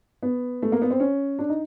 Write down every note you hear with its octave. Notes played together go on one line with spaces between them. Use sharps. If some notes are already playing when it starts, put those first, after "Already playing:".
B3
A3
A#3
B3
C4
C#4
D4
D#4